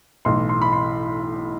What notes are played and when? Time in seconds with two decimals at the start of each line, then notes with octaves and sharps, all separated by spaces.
0.25 B1 A2 E3 C6
0.49 C6
0.62 B5
0.73 C6